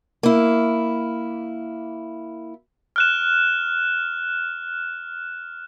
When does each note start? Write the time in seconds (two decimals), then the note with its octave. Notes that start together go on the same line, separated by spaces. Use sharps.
0.23 A#3 E4
2.96 F6 F#6 E7